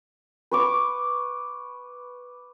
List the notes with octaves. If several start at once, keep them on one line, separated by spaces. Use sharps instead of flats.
B4 C#6 D6